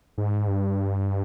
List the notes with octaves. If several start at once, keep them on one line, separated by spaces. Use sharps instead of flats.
G#2
G2